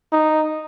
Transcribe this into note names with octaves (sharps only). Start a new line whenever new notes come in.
D#4